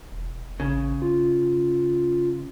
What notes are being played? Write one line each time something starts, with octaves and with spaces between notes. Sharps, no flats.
E1
A1 C#3
F4